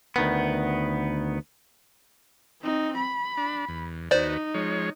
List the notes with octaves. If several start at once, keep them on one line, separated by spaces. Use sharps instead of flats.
D2 D#3 B3
C4 D#4
B5
D4
E2
D#2 D#4 F#4 B4 C5 D5
F3 G#3 C#5